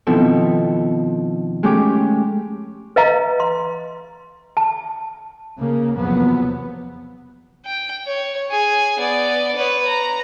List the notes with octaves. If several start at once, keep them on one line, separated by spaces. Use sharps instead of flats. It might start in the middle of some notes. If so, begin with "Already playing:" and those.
B2 D#3 F3 C4 E4 A4
G#3 A3 C#4 G4 D6
B4 D#5 F5 A#5
C6
A5
C#3 A#3
E2 C3 F3 F#3 B3
G5
C#5
G#4 G#5
B3 D5
B4 C#5
A#5